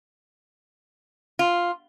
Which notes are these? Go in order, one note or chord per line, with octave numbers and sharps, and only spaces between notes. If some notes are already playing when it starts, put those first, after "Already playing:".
F4